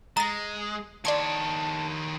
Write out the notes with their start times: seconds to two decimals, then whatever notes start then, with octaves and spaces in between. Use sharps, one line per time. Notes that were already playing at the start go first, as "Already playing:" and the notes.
0.17 G#3 A#5 A6 A#6
1.05 D#3 C#5 D5 A5 C6 G#6